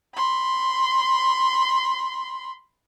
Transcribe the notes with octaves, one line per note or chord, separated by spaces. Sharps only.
B5 C6